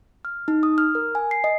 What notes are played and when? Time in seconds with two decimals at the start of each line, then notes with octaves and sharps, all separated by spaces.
0.25 F6
0.48 D#4
0.63 D#6
0.78 F6
0.95 A#4
1.15 G#5
1.31 C7
1.44 D#5